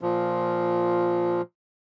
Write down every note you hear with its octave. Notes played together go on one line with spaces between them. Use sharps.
A#2 F3